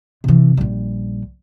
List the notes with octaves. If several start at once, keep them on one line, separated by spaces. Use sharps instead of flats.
C3 E3
A#1 G3